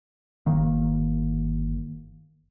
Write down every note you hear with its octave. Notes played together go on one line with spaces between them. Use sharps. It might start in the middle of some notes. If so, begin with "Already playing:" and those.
G1 D#3 A#3